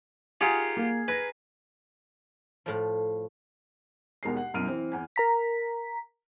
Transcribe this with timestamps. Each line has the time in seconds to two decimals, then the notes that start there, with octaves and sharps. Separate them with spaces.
0.41 F4 G4 G#4 A#4 F#5
0.77 A#3
1.08 B4 G#6 A#6
2.66 A2 F3
4.23 D#2 B2 G#3 A#4 C7
4.37 F#5
4.54 C2 F#2 B2 F6 D7 D#7
4.67 E3 C4
4.92 E2 G#5
5.16 A#4 A#5 B6